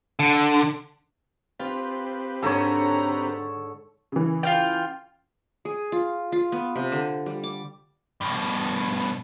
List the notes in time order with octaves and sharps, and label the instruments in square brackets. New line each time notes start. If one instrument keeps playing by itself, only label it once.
[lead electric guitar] D3
[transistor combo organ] C4 G4 B4 [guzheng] F4
[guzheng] G#2 D3 [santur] A4 C#5 [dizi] A#5
[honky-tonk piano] C#3 E3
[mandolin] F4 F5 G5
[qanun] G#4
F4
F4
B3
C3
D3
G3
D6
[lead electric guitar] G2 B2